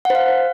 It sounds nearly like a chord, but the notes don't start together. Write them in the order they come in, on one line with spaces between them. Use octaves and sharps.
F#5 C5 F5